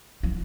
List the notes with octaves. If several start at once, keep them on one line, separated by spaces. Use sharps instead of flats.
F3